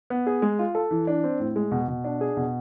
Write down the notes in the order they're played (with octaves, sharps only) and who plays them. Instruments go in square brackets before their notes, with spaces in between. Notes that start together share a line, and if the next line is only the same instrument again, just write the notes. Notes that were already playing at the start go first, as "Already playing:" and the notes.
[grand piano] B3
G#4
G#3
F4
A4
E3
D4
C4
A2
G#3
B2
B2
D4
G#4
B2